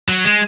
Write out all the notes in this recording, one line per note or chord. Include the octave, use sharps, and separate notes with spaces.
F#3
G#3